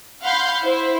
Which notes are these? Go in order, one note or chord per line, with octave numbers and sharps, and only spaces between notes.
F5 F#5 B5 C6 G6
E4 C5